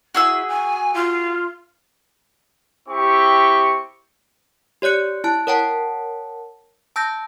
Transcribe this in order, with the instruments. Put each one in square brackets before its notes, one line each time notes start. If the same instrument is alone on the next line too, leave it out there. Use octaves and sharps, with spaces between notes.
[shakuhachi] E4 [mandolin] F#4 G#4 E6
[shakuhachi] G#5
F4
[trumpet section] C4 E4 G4 C#6
[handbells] G4 C#5 D5 F#6 C#7
E4 A5 F#6
A#4 C#5 F#5 G5 A5
A5 E6 G6 A#6